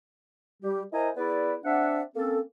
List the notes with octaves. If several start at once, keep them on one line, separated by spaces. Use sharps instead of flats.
G3 G4
E4 A#4 C5 D#5 G#5 A#5
B3 E4 G#4 B4 D5
C4 D4 D5 E5 F#5
A#3 C4 C#4 A4